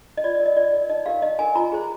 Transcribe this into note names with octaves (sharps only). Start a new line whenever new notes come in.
D#5
F4 D5
D5
A#4
D#5
F4 D5
A#4
D#4 D#5
G4 A#4 F5
D#4 D#5
G4 A#4 G#5
F4 A#5
G#4 C5